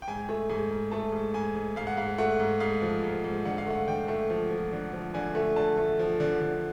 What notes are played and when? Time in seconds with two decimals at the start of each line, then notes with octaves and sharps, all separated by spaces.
0.02 G5
0.08 G#2 G#5
0.29 A3
0.49 G#2 G#5
0.71 G#2
0.91 A3 A5
1.12 G#2
1.34 G#2 G#5
1.55 G#2
1.76 G#2 F5
1.87 F#5
1.97 G#2 F5
2.18 A3 F#5
2.40 G#2
2.60 G#2 F5
2.82 F3
3.03 G#2
3.24 G#2
3.45 D3 F#5
3.58 F5
3.67 A3 F#5
3.88 D3 G5
4.08 A3
4.30 F3
4.51 F3
4.72 D3
4.93 F3
5.14 D3 G#5
5.35 A3
5.56 D3 A5
5.77 A3
5.99 F3
6.20 D3
6.41 D3